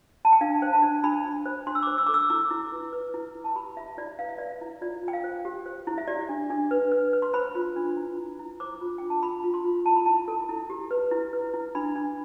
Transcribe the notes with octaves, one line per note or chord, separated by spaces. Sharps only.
A5
G5
D4 F5
C5 G5
A5
D4
D4 B5
D4
C5
D4 C6
E6
C5 D6
E6
A4 D6
E6
E4 D6
E4
B4
B4
E4
E4
A5
G4 B5
E4 E5
E4 D5
B4 F5
E5
B4 D5
E5
E4
F4 D5
F4
G5
F5
C5
G4
C5
E4
E5
G4 D5
D4
D4
B4
B4
B4
C6
C5 B5
F4
D4
E4
E4
E4
C5 D6
F4
D4 G5
A5
F4 B5
F4
C6
F4
E4 A5
B5
E4 A5
A4
E4
G4
B4
E4
B4
E4
D4 B5
D4